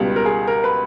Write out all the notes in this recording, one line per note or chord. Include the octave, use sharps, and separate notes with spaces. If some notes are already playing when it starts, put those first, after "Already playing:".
Already playing: C#2 B2 G3
A#4
G#4
A#4
B4